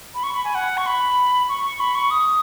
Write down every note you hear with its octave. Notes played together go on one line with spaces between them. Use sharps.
B5
C#6
B5
G#5
F#5
C#6
B5
C#6
B5
C#6
D#6